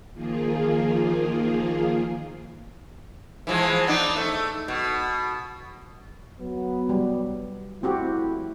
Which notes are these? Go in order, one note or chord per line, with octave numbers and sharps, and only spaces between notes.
D#3 F3 A#3 F4 G#4
E3 F3 G#3
B3 D4 D#4
A3
B2
F#3 B3
G3
F3 A3 C4 E4 F#4 G4